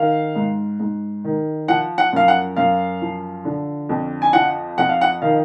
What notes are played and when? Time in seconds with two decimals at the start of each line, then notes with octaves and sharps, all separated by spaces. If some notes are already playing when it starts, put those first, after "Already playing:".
Already playing: D#3 F5
0.35 G#2
0.80 G#2
1.24 D#3
1.68 F3 F#5
1.98 F#5
2.13 F#2 F5
2.28 F#5
2.56 F#2 F5
3.02 F3
3.45 D3
3.89 F2
4.22 G#5
4.33 F3 F#5
4.78 F2 F#5
4.89 F5
5.01 F#5
5.22 D#3 F5